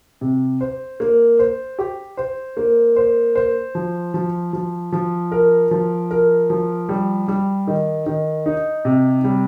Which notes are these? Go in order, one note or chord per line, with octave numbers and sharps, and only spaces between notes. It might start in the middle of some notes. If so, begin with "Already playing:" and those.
C3
C5
A#3
C5
G4
C5
A#3
C5
C5
F3
F3
F3
F3
A#4
F3
A#4
F3
G3
G3
D#3
D#3
D#4
C3
G3